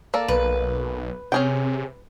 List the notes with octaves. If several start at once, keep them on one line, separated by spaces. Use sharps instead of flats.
A#3 A4 D5
B1 B4
C3 C#4 G#4 G5